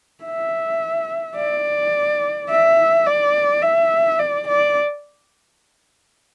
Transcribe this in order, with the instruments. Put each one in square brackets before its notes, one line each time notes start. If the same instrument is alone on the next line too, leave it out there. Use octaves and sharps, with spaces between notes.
[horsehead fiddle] E5
D5
E5
D5
E5
D5
D5